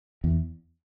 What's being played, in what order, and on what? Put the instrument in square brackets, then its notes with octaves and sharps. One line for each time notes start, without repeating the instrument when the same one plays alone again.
[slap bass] E2